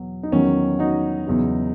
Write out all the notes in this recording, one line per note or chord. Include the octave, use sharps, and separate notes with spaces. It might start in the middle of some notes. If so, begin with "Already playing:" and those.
Already playing: E2 B2 F#3
D#4
E2 D#3 F#3 C#4
D#4 F#4
E2 C#3 F#3